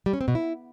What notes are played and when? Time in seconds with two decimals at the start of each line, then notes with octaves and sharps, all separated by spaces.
0.06 G3
0.13 C#4
0.21 C4
0.28 B2
0.35 E4